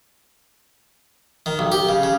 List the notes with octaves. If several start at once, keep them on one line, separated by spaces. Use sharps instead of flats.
D#3
B1
G4
C#3
C#3